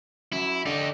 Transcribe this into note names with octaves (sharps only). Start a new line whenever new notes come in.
F#2 E4
D3 D#4 G4